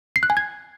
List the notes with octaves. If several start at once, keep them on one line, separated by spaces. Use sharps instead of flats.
C7
F#6
G#5
G#6